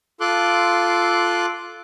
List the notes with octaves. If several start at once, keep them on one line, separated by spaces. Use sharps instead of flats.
F4 A4 C6 D6 F#6